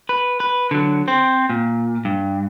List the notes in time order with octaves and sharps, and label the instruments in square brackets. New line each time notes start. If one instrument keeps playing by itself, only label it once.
[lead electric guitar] B4
B4
D3 F#3
C4 C5
A#2
G2